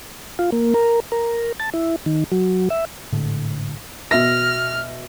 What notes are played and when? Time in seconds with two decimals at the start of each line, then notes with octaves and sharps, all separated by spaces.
0.39 F4
0.52 A#3
0.74 A#4
1.12 A#4
1.60 A5
1.74 E4
2.06 D#3
2.32 F#3
2.70 E5
3.12 G#1 A2 D3
4.11 B2 E5 F6 A#6